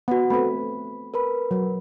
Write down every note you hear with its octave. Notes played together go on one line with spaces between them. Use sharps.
B3 F#4 F#5
A3 C4 B4 B5
A#4 B4 B5
F#3